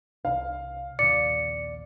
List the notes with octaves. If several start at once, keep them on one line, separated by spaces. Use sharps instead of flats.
C2 F5
A#1 D#2 D5 C#7